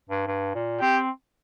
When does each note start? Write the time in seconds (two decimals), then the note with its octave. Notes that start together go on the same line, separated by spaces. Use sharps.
0.09 G2
0.27 G2
0.55 A#2
0.82 C4 G4